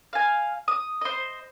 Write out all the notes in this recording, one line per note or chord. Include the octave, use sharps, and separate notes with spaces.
F5 G#5
D#6
C5 D#5